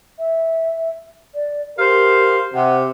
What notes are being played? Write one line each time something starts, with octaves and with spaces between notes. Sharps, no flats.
E5
D5
G4 A#4 C5 F5
C3 F#5